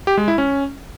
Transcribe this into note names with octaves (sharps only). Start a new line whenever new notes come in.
G4
G#3
E4
C#4